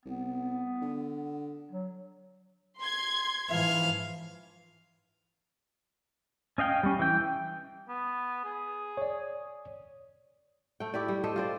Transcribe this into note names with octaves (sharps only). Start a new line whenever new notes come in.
C2 B3
D3
F#3
C6 G#6
G#2 E3 F3 F5
C#4 D#5 F5 G5
G3 C#4
E3 G5
B3
G#4
C#5 D5
A3 G5
E4 G4 D5
G3
G4 A4 C5 D#5
F4 C5 D5